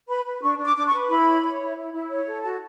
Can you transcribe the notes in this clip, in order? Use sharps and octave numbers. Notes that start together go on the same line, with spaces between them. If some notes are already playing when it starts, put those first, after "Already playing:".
B4 B5
B4
D4 C#6
D4
D6
D4 D6
C#6
B4
E4 B5
C#5
C#5
E4
E4
E4
C#5
A4
F#4 A5